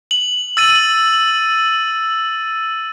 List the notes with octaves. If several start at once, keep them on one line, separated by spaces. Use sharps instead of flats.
F#7
E6 A6 D#7